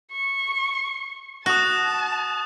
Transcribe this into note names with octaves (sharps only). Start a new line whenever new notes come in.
C#6
F#4 A5 D#6 F#6